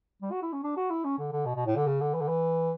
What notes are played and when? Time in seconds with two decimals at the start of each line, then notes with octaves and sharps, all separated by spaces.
0.22 G3
0.32 F#4
0.42 E4
0.52 C#4
0.63 D4
0.77 F#4
0.90 E4
1.04 C#4
1.18 D3
1.32 D3
1.46 B2
1.56 B2
1.66 A2
1.76 D3
1.87 C#3
2.01 D3
2.14 E3
2.21 D3
2.28 E3